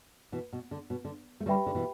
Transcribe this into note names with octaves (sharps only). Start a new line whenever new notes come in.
B2 E3
B2
D3
B2
D3
A3
D3 G3 G4 B4 E5 G5 B5
D3
B2 E3